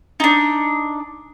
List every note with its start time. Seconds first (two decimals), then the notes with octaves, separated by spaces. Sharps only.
0.20 D4 D#4